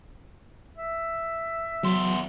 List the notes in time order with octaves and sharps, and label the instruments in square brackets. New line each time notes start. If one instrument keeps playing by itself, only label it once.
[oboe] E5
[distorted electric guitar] E2 C6 [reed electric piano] F#3